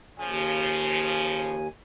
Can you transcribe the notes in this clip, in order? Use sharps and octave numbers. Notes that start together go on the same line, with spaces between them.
D#2 C#3 F3 G#5